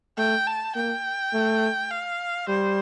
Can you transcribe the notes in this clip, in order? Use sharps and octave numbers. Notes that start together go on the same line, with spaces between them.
A3 G5
A5
A#3 G5
A3
F5
G3 C5